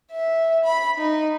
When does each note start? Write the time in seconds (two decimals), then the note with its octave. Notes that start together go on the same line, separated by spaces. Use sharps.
0.12 E5
0.64 B5
0.97 D#4